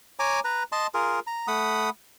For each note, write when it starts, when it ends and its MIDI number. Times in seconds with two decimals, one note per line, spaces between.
0.19 0.40 73
0.19 0.40 80
0.19 0.40 82
0.19 0.40 86
0.44 0.63 71
0.44 0.63 82
0.72 0.87 75
0.72 0.87 81
0.72 0.87 84
0.94 1.20 65
0.94 1.20 68
0.94 1.20 70
1.27 1.47 82
1.48 1.90 57
1.48 1.90 78
1.48 1.90 83
1.48 1.90 87